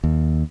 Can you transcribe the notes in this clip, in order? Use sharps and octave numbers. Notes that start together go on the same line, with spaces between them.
D#2